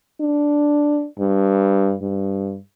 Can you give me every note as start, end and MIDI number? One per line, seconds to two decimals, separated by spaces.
0.21 1.07 62
1.19 1.95 43
2.02 2.57 43